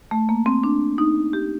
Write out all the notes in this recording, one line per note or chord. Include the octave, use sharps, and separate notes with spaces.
A3
A#3
C4
D4
D#4
G4